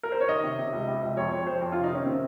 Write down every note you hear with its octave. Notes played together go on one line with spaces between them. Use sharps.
A#4
C5
C#5
D#3 D#5
C3
C3
C#2
C3
C#2
F2 C#5
F2 C#5
F2 C5
F2
F4
C3
D#4
D#3 C#4
C3 C4